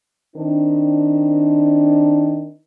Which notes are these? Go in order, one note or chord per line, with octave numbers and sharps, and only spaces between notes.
D#3 C4 D4